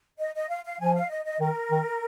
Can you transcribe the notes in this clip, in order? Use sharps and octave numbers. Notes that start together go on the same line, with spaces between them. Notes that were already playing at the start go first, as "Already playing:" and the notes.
D#5
D#5
F5
F5
F3 G#5
F5
D#5
D#5
D#3 A#4
D#3